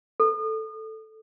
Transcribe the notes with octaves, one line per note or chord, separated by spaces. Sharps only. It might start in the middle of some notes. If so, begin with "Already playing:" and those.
A4